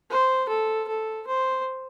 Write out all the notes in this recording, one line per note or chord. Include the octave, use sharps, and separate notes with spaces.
C5
A4
A4
C5